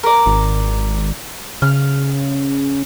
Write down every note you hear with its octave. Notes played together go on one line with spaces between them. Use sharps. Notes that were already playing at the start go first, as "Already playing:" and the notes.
A#4 D5
G#1
C#3 F6